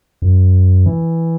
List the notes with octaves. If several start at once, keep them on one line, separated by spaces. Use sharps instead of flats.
F#2
E3